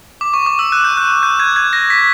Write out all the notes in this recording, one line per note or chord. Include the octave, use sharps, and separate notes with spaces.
D6
C#6
D6
E6
F#6
G6
F#6
F#6
G6
G#6
G#6
A#6
B6